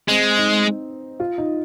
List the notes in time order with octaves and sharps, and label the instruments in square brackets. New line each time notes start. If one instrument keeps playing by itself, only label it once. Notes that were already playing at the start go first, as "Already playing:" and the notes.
[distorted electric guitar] G#3 [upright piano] C4
[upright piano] D#4
F4
D#4